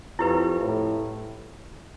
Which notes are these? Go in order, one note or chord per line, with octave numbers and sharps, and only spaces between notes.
F2 E4 G4 B4
A2